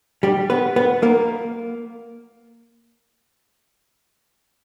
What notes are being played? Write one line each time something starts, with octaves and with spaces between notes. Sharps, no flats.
G3 G4
B3 B4
B3 B4
A#3 A#4